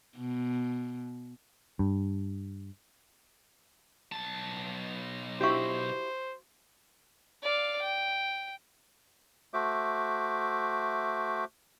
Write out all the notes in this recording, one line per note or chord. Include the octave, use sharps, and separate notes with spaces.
B2
G2
B1 A5
E4 F#4 G4 C5 F5 C#6
D5 F5
G5
A3 F#4 C5 E5 D6